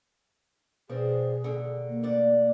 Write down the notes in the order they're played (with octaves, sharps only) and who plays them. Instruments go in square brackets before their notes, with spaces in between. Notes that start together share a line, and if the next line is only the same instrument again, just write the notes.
[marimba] B2 [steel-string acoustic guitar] F3 C4 D4 [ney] G#4
[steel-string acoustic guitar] D#2 D3
[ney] A#3
[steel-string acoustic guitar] D2 D5 F#5